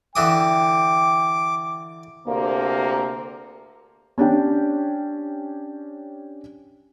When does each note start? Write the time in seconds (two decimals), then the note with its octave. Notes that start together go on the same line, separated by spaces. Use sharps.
0.16 D3 E3 G5 D6 D#6
2.27 D2 C3 A#3
4.18 C#4 D4 G4 G5